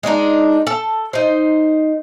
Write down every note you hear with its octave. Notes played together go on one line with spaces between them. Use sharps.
G#3 C4 D4 D#4
A4 A5
D#4 C5